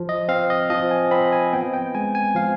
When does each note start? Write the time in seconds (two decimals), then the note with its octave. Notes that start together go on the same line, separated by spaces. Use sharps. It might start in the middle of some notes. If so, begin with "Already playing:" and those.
Already playing: F3
0.09 D#5
0.28 C4 F5
0.50 D#5
0.70 F3 D#5
0.91 G#5
1.11 C4 B5
1.32 G#5
1.53 B3 G5
1.74 G5
1.95 G#3 G#5
2.15 G#5
2.35 F3 F5